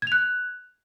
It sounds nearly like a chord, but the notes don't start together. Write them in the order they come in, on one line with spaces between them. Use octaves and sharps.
G#6 F7 F#6